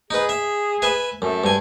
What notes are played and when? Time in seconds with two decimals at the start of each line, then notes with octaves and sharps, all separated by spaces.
0.11 D#4 G#4 B4
0.29 E5
0.82 B4 E5 G#5
1.22 F#2 A3
1.44 G2 G#5